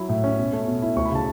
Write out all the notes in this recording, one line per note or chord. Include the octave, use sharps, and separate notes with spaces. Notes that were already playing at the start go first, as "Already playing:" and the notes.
Already playing: F#3 E4 B5
A2
C#4
B2
A3
B2
E4
D2 C#6
B5
C#3 A5